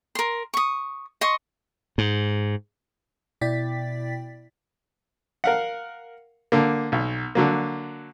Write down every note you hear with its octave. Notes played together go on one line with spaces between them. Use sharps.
A#4 C6
C#6 D#6
D#5 C6 C#6
G#2
B2 E4 D5 G5 A6 B6
A#4 F5 F#5
D3 A#3
B1
D3 F#3 A#3